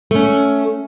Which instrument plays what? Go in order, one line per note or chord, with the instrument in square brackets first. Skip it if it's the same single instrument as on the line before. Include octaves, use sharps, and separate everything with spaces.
[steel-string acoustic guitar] A3 C#4